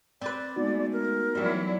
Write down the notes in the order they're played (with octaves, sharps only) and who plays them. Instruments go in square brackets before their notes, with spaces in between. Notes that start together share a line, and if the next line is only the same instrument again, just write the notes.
[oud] C4 B4 [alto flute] D5
[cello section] G#3 A3 [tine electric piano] B3 D#4 F#4
[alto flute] A#4
[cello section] E3 F#3 E4 [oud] G3 C4